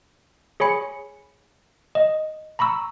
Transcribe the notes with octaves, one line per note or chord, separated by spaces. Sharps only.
G#4 C#5 G#5 B5 C#7
D#5
A#5 B5 C#6 E6